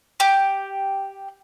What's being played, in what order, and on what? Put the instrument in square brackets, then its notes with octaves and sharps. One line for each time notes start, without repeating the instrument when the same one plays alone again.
[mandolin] G4